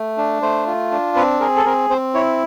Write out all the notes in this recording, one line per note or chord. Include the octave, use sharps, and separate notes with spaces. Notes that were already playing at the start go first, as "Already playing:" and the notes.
Already playing: A3
D4
A3 C5
F4
D4
C4 B4
G#4 A#4
A4
C4 A#4
C4 C5
E4 C#5